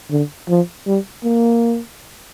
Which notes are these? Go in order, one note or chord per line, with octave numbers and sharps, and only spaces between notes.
D3
F3
G3
A#3